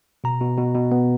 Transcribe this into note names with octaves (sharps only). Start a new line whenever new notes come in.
B2 A#5
B2
B2
B2
B3